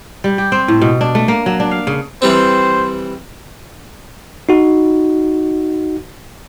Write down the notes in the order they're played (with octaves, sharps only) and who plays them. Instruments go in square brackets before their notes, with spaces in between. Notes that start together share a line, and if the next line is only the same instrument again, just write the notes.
[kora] G3
G4
C4
A2
B2
D4
A3
A#3
F#3
D4
F5
C#3
[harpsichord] E3 G3 C4 [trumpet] C5
[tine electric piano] D#4 F#4